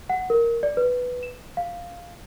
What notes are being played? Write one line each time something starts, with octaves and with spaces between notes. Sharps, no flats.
F#5
A#4
D5
B4
E7
F5